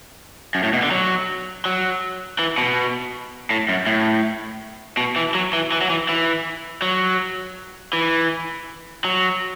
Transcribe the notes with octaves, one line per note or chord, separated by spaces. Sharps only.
F#2
A2
B2
D3
F#3
F#3
E3
B2
A2
F#2
A2
B2
E3
F#3
E3
E3
F#3
E3
E3
F#3
E3
F#3